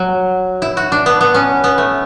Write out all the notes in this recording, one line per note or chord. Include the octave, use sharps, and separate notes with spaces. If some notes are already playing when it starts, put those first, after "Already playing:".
Already playing: F#3
E4
F#4
D4
B3
B3
C#4
B3
A3